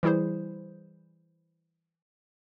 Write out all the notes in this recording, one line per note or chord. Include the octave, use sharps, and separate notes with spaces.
E3 G3 E4 G#4 C5